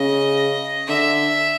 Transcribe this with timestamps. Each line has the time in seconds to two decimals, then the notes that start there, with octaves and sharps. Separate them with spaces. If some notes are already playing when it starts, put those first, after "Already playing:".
Already playing: C#3 D#5
0.87 D3 E5